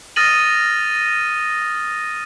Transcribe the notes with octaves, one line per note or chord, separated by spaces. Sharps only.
D#6 F6 A6 A#6 D#7 F#7